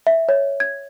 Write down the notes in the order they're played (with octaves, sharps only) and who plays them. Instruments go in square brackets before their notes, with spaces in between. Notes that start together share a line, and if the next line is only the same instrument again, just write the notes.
[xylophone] E5
C#5
G#6